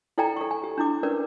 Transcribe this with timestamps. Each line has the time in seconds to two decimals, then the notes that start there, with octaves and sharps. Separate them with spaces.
0.18 E4 A4 D5 G5 G#5 A#5
0.37 A4 C#6
0.51 G#5
0.64 G4
0.78 D4 E4 D6
1.03 C#4 A#4 B4 D5